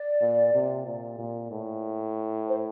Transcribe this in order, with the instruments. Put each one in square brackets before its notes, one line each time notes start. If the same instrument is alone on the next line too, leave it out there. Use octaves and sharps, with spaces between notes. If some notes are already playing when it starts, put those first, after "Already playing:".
Already playing: [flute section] D5
[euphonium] A#2
C3
A#2
A#2
A2
[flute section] C5